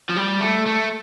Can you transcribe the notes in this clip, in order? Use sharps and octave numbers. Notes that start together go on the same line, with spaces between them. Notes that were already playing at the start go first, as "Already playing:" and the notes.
F3
G3
A3
A3